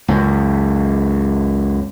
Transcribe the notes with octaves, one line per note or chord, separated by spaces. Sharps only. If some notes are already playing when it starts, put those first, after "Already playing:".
C#2 F#2